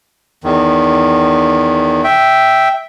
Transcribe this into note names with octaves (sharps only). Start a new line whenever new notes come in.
E2 D#3
E5 G5